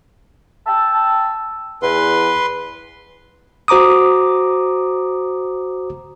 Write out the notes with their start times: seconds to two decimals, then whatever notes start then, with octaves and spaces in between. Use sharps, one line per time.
0.67 G5 A5 E6
1.82 E2 B4 C6
3.68 F#4 C5 A#5 D6 D#6